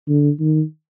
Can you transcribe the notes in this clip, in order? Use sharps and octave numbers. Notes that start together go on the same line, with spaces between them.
D3
D#3